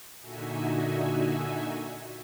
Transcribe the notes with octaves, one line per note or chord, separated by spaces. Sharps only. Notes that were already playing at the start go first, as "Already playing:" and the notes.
A#2 D3 D#4 F#4 E5 G#5